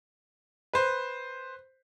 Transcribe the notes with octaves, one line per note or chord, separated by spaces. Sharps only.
B4 C5